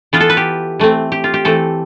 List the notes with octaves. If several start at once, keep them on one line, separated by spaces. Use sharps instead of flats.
E3 B3 F4
A4
B4
G4
E3 A3 C4
G4
F4
G4
E3 A3 C4 A4